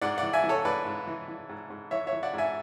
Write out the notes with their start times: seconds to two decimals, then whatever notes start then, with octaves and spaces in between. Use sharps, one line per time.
0.02 G#2 D5 F#5
0.18 D5 F#5
0.23 E3
0.33 E5 G#5
0.44 E3
0.49 A4 C#5
0.65 G#2 B4 D5
0.86 G#2
1.07 E3
1.28 E3
1.49 G#2
1.70 G#2
1.91 E3 C#5 E5
2.07 C#5 E5
2.13 E3
2.23 D5 F#5
2.33 G#2
2.38 E5 G#5